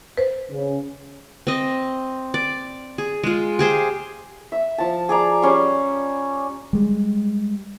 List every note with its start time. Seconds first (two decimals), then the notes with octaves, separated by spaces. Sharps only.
0.17 B4 C5
0.52 C#3
1.47 C4 D#5
2.34 D5
2.98 G#4
3.24 G#3 F4
3.59 G4 G#4 C5
4.52 E5
4.78 F3 A5
5.09 G#4 D5 A#5
5.42 G3 C#4 C6
6.73 G3 G#3